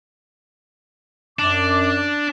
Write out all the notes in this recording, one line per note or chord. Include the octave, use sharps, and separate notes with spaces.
F#2 D4 D6